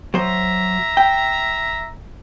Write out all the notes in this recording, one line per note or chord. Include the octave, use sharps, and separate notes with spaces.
F#3 C5 E5 A#5
G5